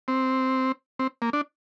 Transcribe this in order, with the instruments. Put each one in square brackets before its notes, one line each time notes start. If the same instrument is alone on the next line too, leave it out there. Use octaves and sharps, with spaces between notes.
[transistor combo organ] C4
C4
A#3
D4